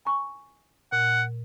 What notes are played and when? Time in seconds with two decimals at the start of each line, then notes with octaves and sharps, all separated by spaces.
0.05 G#5 A#5 C#6
0.92 A#2 F#5